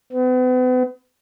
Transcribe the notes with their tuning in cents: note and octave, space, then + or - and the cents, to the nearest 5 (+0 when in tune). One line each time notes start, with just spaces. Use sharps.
B3 +40